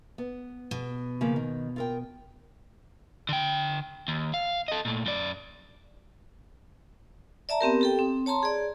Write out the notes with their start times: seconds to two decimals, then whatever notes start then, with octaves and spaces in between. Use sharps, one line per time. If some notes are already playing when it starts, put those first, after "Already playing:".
0.18 B3
0.71 B2
1.21 C#3 F3 A#3
1.36 D#3
1.76 F4 A#4 G5
3.29 D3 G5
4.08 D#2
4.34 F5
4.68 A4 D#5
4.85 A#2 A3
5.06 F#2 D5
7.49 D5 E5 A5 A#5
7.61 B3 C4 G4 A#4
7.81 G4 A4 G5
7.99 C4
8.26 C#5 A5 A#5 C6
8.43 G#4 D5